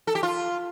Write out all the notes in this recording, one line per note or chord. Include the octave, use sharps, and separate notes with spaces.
A4
G4
F4